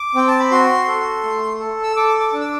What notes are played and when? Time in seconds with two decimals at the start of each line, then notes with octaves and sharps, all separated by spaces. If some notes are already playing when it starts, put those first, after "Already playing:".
Already playing: D6
0.15 C4 G5
0.28 A5
0.40 B5
0.51 F#4 C6
0.88 A4
1.24 A3
1.59 A4
1.83 E6
1.96 A4 D6
2.20 D6
2.33 D4
2.40 E6
2.44 D6